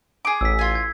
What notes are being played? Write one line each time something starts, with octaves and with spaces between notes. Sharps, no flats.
G#4 D6
A1 E6 B6
F4 G#5
G#6